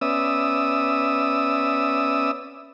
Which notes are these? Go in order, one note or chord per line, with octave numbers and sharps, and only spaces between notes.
B3 C#4 D5 E5 D#6 E6